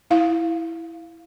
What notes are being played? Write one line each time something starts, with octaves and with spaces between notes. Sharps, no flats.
E4 F5